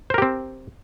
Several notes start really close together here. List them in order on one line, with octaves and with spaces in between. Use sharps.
C5 A#4 G4 C4